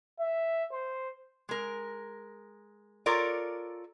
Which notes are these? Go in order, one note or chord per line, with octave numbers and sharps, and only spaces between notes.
E5
C5
G#3 A#4
F4 A4 A#4 C#5 D5